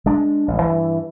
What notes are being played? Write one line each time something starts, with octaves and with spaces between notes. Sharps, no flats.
G#3 D4
A1
G2 E3